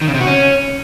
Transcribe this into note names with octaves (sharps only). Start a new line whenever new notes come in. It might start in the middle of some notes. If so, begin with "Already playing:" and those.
D#3
C#3
C3
F#4
C#4